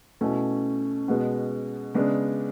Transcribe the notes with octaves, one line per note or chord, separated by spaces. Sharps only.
B2 A3 C#4 E4
B2 G#3 B3
C#3 G#3 B3 D4